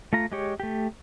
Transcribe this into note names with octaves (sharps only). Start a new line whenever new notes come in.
A3 F4 A#5
G#3 G4 C#5
A3 G4